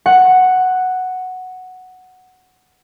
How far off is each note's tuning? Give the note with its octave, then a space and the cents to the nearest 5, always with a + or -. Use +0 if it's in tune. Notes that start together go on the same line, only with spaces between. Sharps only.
F#5 +0 C#6 -45